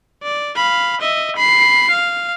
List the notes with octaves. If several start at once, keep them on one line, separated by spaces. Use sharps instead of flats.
D5
F5 B5
D#5 E5
B5 C7
F5